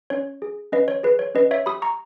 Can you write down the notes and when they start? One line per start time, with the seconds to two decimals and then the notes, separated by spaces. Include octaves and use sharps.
0.10 C#4 C#5
0.42 G#4
0.72 C#4 B4 D#5
0.88 C#5
1.03 G#4 B4
1.19 C#5
1.35 C#4 B4 D#5
1.51 C#5 E5
1.66 G4 B5 D#6
1.82 A#5 C#6